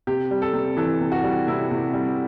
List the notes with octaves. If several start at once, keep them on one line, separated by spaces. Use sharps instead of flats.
C3 G4
G3
A4
C3
E3 A4
C3
F#4
G3
C3 E4
C3
G3